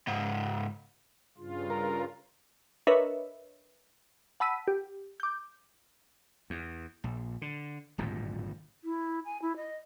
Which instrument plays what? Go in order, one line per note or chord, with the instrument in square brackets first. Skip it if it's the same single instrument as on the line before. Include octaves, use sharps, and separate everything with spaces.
[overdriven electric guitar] C#2 G#2
[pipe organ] G2 C#3 F4
[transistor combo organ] A#4
[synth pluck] D4 A#4 B4 C#5 D#5 E5
F#5 A5 B5 E6 B6 D#7
G4
D6 G6
[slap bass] E2
A#1
D3
D1 G#1 G2 A#2
[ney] E4
G#5
E4
D#5